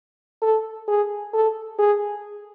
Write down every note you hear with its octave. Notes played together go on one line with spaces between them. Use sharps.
A4
G#4
A4
G#4